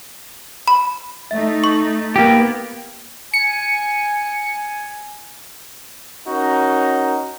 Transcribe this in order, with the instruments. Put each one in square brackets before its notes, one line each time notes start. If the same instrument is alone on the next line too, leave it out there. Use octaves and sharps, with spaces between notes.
[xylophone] B5
[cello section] A3 D#4 [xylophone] E5
[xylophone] C#6
[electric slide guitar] A#3 G4 [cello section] B3
[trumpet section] G#5 [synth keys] C#7
[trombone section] C#4 D#4 F#4 A#4